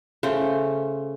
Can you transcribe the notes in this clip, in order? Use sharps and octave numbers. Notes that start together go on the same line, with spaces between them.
C#3 A3 C5